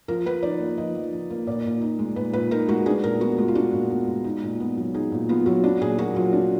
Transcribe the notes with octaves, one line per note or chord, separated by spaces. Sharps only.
F3 A#4
F3 B4
D#4 D5
A#3
F3 D#5
F3
D#4
A#3
A#2 D5
A#2
D#4
G#3
A#2 B4
A#2 B4
D#4 A#4
G#3 F#4
D4 G#4
A#2 A#4
B3 F#4
G#3 F4
F4
D4 F#4
A#2
B3
G#3
D#4
A#2
B3
F#3
D#4 G#4
A#2
B3 F4
F#3 F#4
D4
A#2 G#4
A#3 F#4
F#3 F4
D4